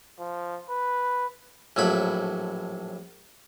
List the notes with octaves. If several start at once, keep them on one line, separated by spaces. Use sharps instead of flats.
F3
B4
A#1 A2 F#3 B5